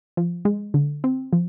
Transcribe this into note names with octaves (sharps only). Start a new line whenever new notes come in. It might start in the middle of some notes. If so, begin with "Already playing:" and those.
F3
G#3
D3
C4
F3